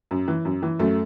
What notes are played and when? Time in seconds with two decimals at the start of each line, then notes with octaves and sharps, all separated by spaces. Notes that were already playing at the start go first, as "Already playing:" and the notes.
0.11 F#2
0.28 E3
0.45 F#2
0.62 E3
0.79 F#2 A3